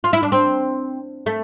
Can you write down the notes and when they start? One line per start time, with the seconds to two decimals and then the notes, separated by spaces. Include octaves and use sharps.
0.04 F4
0.13 E4
0.23 D4
0.32 C4
1.26 A3